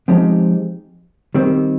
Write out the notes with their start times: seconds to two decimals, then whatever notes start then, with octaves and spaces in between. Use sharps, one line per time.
0.08 F3 G#3 C4 D#4 G4
1.34 D#3 G3 C4